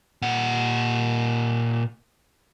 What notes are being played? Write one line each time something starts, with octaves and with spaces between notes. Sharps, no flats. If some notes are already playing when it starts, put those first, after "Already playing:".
A#2 F#5